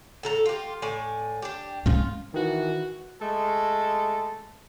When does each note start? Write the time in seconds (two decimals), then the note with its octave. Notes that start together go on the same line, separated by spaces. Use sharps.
0.23 A2 A4 A#5
0.46 F4 G4
0.82 A2 D5 G#5
1.42 D4 G4
1.86 G#3 C#4 F4
2.34 D#3 E3 F#4
3.20 G#3 A3 A4